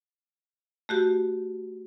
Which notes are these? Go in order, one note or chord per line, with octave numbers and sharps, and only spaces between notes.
A3 F#4 G4